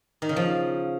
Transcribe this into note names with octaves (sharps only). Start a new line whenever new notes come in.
D#3
C#3
F3